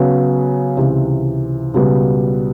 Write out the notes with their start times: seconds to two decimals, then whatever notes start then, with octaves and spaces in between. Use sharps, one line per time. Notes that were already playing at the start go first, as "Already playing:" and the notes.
Already playing: C#3 F#3 B3
0.77 C#2 C3 E3
1.74 C#2 B2 G3 B3